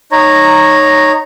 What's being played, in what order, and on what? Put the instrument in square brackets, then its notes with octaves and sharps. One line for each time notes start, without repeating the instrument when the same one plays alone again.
[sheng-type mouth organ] D#4 C#5 A#5